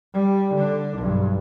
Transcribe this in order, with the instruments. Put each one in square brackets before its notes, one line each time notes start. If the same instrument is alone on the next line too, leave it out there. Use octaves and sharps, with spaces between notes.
[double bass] G3
D3 D4
B1 G2